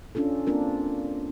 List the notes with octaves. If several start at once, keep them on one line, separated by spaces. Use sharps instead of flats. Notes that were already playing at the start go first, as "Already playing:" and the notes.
C#4 D4 F4 A4
A#3 C4 D4 F4 A#4